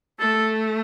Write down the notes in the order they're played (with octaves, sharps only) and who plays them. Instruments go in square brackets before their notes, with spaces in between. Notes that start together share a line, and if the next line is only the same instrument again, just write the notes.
[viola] A3 [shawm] A4